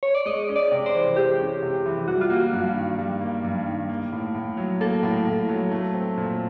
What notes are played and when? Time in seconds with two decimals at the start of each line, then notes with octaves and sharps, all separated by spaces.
0.03 C#5
0.15 D5
0.26 G#3 D#5
0.49 C#4
0.56 D5
0.72 C3
0.86 C5
0.95 E3
1.16 G#3 G4
1.40 C#4
1.63 C3
1.86 E3
2.08 G3 F#4
2.21 F4
2.30 A#3 F#4
2.53 G2
2.77 D#3
2.99 G3
3.21 A#3
3.44 G2
3.66 D#3
3.89 A#3
4.12 A2
4.35 A2
4.57 F#3
4.81 A#3 A4
5.03 A2
5.26 A2
5.49 F#3
5.72 A3
5.94 C4
6.18 A#2